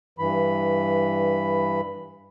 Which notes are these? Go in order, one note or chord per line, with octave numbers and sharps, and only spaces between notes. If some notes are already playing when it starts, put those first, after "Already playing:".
G2 E3 B5